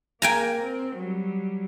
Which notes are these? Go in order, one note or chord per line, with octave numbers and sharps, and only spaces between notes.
A#3 A#4 G5 G#5 A#5
C4
F#3 G3